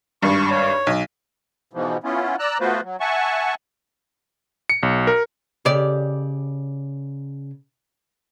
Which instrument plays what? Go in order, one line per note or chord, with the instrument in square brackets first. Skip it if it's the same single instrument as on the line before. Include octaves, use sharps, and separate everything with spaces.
[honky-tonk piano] G#1 G2 [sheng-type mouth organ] C#6
[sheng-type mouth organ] C#5
[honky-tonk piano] B1
[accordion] G#2 B2 E3 F3
B3 C#4 E4 F4
D5 A#5 E6 F#6
A3 B3 F4 F#4 B4 C5
F#3
E5 F#5 G#5 A5 C#6
[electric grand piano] C#7
B1
A#4
[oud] C#3 G4 D5